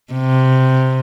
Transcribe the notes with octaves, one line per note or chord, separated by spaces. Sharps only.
C3